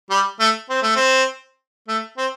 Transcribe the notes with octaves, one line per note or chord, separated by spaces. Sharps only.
G3
A3
C4
A3
C4
A3
C4